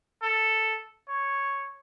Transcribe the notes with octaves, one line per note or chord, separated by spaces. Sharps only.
A4
C#5